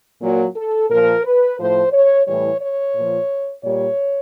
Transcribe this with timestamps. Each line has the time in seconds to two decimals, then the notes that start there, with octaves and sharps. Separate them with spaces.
0.22 A#2 F#3
0.56 A4
0.90 A#2 F3 A#4
1.25 B4
1.58 A2 F3 C5
1.93 C#5
2.27 A2 E3 G3 C#5
2.61 C#5
2.95 A#2 F3
3.64 A#2 G3 C#5